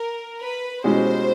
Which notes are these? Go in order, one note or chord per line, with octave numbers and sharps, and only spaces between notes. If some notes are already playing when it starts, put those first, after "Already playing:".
Already playing: A#4
B4
B2 G#3 C#4 E4 G4 C5